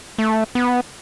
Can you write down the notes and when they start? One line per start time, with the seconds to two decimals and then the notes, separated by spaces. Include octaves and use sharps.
0.19 A3
0.55 B3